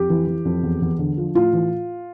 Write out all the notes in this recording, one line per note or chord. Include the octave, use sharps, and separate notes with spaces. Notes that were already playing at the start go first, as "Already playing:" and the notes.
Already playing: F2 G4
E3
E3
F2
E2
E2
D3
F3
A2 F4
E3